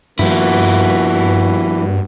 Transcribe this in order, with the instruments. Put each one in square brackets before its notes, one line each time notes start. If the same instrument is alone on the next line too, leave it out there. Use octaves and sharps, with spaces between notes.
[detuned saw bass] G2 [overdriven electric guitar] F3 E4 [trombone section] A#3 B3 F#4